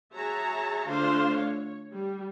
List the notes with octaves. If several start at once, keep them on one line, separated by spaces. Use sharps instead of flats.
F#4 G#4 C#5 E5 A5 A#5
D3 A3 D4 F4 C5 F5
C#5
G3